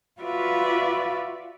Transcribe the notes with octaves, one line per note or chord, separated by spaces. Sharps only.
F4 F#4 B4 D5 E5 F5